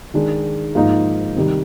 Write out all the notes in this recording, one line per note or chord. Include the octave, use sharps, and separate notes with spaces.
D#3 G#3 D4
G#2 F3 A#3 D#4
C3 D#3 G3